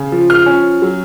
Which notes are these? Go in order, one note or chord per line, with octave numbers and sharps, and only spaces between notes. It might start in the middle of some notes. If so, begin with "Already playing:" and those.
Already playing: C#3
F3
F6
C#4
F#3